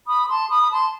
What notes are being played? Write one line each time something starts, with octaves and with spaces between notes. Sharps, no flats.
B5 D#6
D#6
A5 C6
B5 D#6
B5
A5 C6